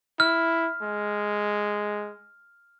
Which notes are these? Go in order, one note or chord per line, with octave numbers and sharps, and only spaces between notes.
E4 F6
G#3